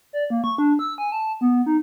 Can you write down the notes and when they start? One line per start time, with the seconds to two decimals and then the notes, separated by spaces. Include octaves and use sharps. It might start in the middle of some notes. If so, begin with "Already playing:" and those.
0.13 D5
0.30 A#3
0.44 C#6
0.58 D4
0.79 E6
0.98 G#5
1.12 A5
1.41 B3
1.66 D#4